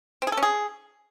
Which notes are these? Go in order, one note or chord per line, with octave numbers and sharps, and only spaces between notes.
C4
G#4
A4
C#4
G#4